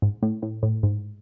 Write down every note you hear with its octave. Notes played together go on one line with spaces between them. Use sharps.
G#2
A2
A2
A2
G#2